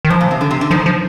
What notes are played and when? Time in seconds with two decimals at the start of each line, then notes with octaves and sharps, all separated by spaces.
0.05 D#3
0.10 G#2 F3
0.21 A#2
0.31 C3
0.41 D3
0.51 C3
0.61 D3
0.71 D#3 F3
0.86 F3